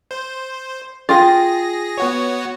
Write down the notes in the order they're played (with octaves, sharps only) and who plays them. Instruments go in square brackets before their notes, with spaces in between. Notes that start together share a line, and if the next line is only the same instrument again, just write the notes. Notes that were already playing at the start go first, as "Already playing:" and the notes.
[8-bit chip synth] C5
[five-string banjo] F4 G5 [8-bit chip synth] G#4 A#6
[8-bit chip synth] B3 F#4 C#5